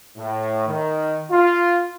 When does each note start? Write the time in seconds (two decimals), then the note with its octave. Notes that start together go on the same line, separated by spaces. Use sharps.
0.17 A2
0.68 D#3
1.31 F4